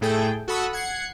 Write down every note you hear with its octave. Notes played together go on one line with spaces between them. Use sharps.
A2 A3 G#4 A4 G5
F#4 A4 F#5 B5 D#6 E6
F#5 G#6 C7 C#7